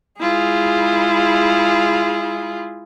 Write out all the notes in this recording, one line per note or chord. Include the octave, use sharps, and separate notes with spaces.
G#3 E4 F4 G#4